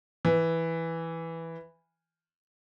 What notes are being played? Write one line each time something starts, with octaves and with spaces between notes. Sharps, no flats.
E3